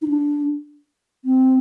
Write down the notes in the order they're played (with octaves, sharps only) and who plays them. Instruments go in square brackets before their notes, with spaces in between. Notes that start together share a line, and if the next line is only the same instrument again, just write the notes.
[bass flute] D#4
D4
C4